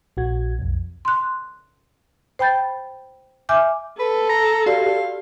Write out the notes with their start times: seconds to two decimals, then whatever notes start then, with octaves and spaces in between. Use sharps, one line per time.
0.17 A#1 F#4 G#6
0.59 B1 F2
1.05 C6 F#6
2.39 C5 G5 B5 G6 A6
3.49 E5 G#5 D6 F6 G6
3.99 A4 B4
4.29 A#5
4.66 F#4 G4 D5 F5